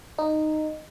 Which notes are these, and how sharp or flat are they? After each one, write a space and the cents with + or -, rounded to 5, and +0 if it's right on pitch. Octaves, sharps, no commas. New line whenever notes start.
D#4 -10